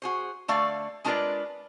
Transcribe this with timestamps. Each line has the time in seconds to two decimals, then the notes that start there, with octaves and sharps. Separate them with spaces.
0.02 F#4 G#4 C5
0.48 D3 A3 D5 F5
1.04 G#3 D4 F4 A#4 B4 D5